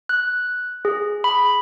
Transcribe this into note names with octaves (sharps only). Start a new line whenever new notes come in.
F#6
G#4
B5